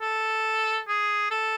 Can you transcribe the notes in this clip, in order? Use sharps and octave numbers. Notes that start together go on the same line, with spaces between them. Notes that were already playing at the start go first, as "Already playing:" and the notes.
A4
G#4
A4